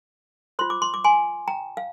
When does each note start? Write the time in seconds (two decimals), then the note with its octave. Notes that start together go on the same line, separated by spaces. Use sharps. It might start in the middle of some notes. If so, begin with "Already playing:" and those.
0.59 F4 C5 C6
0.70 D6
0.82 C6
0.94 D6
1.04 G#5 C6
1.48 G5 A#5
1.77 F5